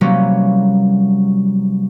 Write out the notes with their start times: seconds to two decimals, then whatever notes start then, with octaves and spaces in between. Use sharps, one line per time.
0.01 C3 E3 F#3 G3 A#3 C#4